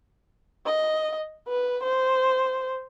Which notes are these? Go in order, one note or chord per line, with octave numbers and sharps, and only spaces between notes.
D#5
B4
C5